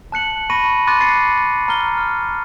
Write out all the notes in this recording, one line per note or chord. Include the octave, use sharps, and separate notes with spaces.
A5 F#6 C#7 F#7
A5 B5 C#6 A#6 D#7
B5 C6 D6 F#6 A6 D#7
A6 C7 C#7
A#5 F6 G7
F6